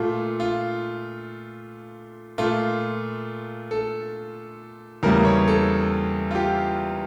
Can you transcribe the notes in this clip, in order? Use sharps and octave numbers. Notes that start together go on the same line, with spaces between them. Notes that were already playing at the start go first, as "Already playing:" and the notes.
Already playing: A#2 A3 F4
F4
A#2 A3 F4
A4
E2 C#3 G3 A#3 A#4
C#5
A4
F4
G4